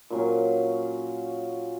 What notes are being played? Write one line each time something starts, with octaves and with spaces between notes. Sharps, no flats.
A#2 F#3 C#4